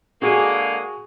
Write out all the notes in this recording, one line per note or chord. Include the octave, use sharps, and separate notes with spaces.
D3 G#3 A#3 F#4 G#4